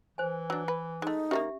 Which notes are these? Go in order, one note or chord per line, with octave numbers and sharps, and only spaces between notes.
E3 C5 G#5
F#3 D4
B4
G#3 A3 D#4
D#3 G3 A#3 C#4 G4 E5